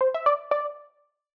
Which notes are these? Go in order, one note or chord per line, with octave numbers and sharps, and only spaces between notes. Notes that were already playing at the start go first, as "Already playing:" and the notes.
C5
E5
D5
D5